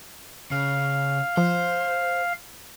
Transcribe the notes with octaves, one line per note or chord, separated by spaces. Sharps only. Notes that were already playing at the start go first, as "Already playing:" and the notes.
C#3 F5
F3 C5